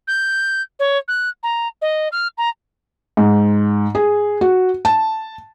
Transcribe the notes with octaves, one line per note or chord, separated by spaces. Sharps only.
G6
C#5
F#6
A#5
D#5
F6
A#5
G#2
G#4
F#4
A5